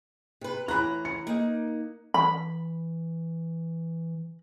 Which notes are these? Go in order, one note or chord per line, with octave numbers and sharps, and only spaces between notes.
C3 B4
A2 E3 A#5 B5 F#6
C#7
A#3 D#4
E3 B5